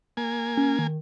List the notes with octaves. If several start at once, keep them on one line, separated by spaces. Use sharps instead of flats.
A#3 G#5
C#4
D#3